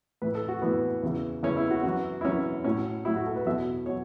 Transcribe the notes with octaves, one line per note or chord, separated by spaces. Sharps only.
A2 E3 B4
A4
F#4
A2 E3 B3
E2 C#3 E3
E2 C#3 E3 C#4
E4
F#4
F#2 E3 F#4
E4
F#2 E3 C#4
A2 F#3 C#4
A2 F#3 E4
F#4
A4
B4
E2 B2 F#3 E5
B2 F#3 C#5